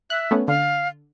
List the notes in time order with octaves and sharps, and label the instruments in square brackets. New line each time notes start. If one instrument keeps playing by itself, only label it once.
[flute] E5 [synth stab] F#6
[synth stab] A3 B3 C#4
[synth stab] D3 [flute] F5